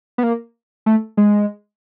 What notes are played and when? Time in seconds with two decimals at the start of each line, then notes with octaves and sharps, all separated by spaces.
0.18 B3
0.23 A#3
0.86 A3
1.17 G#3